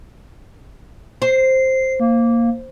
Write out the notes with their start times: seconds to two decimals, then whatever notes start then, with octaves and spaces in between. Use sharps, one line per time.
1.22 C5 C7
2.00 A#3